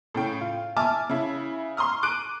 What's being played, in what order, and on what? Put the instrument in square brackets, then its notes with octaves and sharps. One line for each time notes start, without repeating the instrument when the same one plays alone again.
[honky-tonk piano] A2 C#3 G5
F4
E5 G#5 A5 D6 F6
C#3 E4
C6 C#6 D#6 F6
D6 F#6 D7 D#7